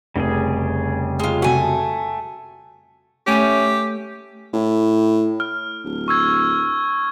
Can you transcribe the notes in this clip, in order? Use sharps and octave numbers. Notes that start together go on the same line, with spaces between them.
F1 C#3 G3 G#4
G#3 F4
C3 A3 F#4 G#5
A3 C#4 G4
A2
F6
D1
C#6 E6 G#6